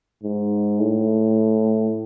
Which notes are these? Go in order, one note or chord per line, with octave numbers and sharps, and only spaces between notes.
G#2
A2